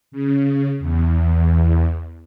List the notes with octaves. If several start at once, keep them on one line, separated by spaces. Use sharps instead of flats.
C#3
E2